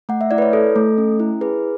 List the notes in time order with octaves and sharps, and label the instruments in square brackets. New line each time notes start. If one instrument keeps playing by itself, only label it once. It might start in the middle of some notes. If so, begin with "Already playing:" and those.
[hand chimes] A3 F#5
E5
E4 D5
B4
C#5
A4
A3
C#4
E4
G#4 B4